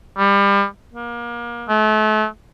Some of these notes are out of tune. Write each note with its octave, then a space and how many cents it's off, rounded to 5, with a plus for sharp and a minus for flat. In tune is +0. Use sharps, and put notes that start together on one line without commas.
G3 +30
A#3 +30
A3 -35